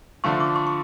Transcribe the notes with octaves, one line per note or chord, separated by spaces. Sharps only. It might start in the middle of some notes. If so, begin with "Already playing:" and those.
D3 F3 A3 F4 C#6
D6
C#6
C#6